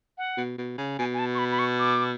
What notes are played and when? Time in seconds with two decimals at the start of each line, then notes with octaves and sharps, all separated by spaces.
0.18 F#5
0.37 B2
0.58 B2
0.78 C#3
0.99 B2 G#5
1.14 G#5
1.19 A5
1.34 C#6
1.38 B5
1.51 B5
1.59 C#6
1.79 D6